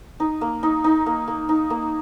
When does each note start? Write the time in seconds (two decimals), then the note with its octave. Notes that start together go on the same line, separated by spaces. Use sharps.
0.20 D#4
0.41 A#3
0.63 D#4
0.84 D#4
1.06 A#3
1.28 A#3
1.49 D#4
1.70 A#3